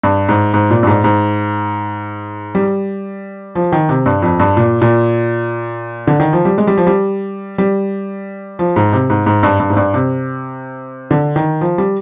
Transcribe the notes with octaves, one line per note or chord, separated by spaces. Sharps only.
G2
G#2
G#2
A#2
G2
G#2
G#2
G3
F3
D#3
C3
G2
F2
G2
A#2
A#2
D3
D#3
F3
G3
G#3
G3
F3
G3
G3
F3
G#2
C3
G#2
G#2
G2
G2
G#2
G2
C3
D3
D#3
F3
G3